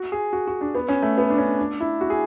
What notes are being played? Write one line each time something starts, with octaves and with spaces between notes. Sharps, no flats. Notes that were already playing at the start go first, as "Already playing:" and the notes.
Already playing: F#4
G#4
F#4
F#4
D4
B3
C#4
A3
B3
D4
C#4
D4
E4
F#4
G#4